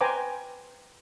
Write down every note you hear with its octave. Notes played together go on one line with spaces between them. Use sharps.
B4 C5 G5 G#5 A#5 D6